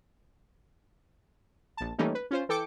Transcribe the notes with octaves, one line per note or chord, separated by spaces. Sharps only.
A#1 A5
E3 G3 A3 A#3 C#4 D#4
B4
C#4 F4 C5
E3 A4 G5 D6 C#7